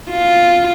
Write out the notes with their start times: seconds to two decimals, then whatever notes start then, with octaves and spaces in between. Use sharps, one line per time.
0.11 F4